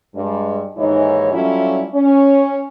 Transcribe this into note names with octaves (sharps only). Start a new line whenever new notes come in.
G2 G#3
D#2 G#2 E3 D#4 C#5 D#5
F#3 G3 A3 C#4 E4 F4
C#4